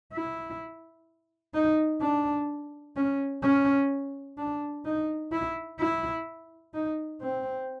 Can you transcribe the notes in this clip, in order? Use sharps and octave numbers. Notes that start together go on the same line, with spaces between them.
E4
D#4
D4
C#4
C#4
D4
D#4
E4
E4
D#4
C4